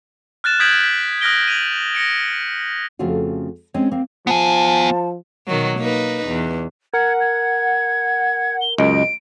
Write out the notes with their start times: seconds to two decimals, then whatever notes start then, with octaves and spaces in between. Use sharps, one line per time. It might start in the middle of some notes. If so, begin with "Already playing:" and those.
0.44 F6 F#6 A6 E7
0.60 D#6 G6 G#6 B6 D7 F#7
0.83 B6
1.21 D#6 F6 F#6 A#6 D7 G7
1.48 D#7 F7 F#7
1.95 A#6 C#7 D7
2.99 F2 C#3 A3 C#4 F4 F#4
3.74 G#3 C4 C#4 C#5
3.91 A#3 C4
4.27 F3 B3 G#5 A5
5.48 B2 D#3 F#3
5.79 A#3 D#4 B4
6.27 E2
6.94 A#4 F#5 G#6
7.21 G#6
8.61 G7
8.78 C#2 F#2 D#5 D7